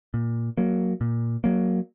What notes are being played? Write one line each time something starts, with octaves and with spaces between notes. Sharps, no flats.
A#2
F#3 A#3
A#2
F#3 A#3